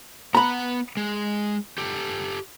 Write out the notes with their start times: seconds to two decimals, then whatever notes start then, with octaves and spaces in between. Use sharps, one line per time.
0.35 B3 F#5 A#5 B5
0.97 G#3
1.78 G4 A4